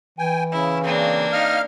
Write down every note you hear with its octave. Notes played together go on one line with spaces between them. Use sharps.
E3 G5 G#5
C#3 E4
A#3 C4 D4
D#4 F5 F6